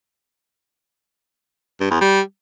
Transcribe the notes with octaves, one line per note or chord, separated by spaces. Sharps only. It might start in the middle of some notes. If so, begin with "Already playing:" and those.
G2
E2
G3